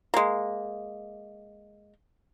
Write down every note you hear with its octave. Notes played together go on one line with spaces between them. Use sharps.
G#3 A#3